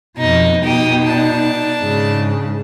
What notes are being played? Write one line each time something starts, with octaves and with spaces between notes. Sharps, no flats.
F2 B2 D#4
B2 D#4 G4 D#6
D4 A5
G#2 C#3